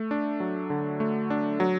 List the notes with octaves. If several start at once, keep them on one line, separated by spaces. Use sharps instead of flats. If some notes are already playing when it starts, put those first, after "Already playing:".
Already playing: A3
D4
F#3
D3
A3
D4
F#3